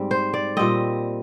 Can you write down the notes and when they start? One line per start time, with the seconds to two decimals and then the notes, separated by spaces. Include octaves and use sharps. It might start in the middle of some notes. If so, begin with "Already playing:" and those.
Already playing: G#2 G3 C4
0.11 C5
0.34 D5
0.57 A#2 G3 C4 D#5